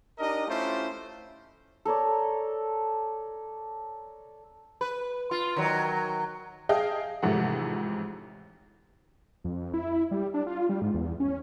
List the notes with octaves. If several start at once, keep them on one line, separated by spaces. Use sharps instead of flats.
D4 D#4 G4 A#4 D#5
A3 C#4 E4 F4 G4 C5
A4 A#4 C#5 D5
B4
F4
D#3 F#3
G#4 D#5 F5 G5 A5
A1 F2 G#2 C3 A3 F#5
F2
E4
G3
D4
F4
G3
G#2
E2
C#4